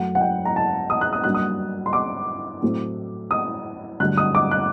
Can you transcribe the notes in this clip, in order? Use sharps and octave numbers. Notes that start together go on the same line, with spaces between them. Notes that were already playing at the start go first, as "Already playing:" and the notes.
Already playing: F#2 F#3 A3 F#5
F#5
G5
A#5
A5
D#6
F#6
D#6
G2 F#3 A#3 D4 F#6
D#6
C6
D6
A2 F#3 A3 C4
D#6
G2 D3 F#3 A3 F#6
D#6
D6
F#6